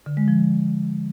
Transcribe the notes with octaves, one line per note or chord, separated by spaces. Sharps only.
D3
G#3
F3